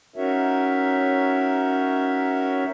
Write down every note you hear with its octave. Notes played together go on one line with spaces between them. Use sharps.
C#4 D#4 F#4 A#4 C#5 E5